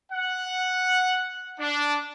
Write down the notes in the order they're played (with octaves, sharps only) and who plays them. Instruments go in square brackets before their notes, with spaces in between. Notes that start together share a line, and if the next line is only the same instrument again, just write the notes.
[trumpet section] F#5
D4